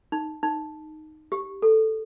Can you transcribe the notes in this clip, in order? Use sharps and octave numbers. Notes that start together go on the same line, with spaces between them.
D#4
D#4
G4
A4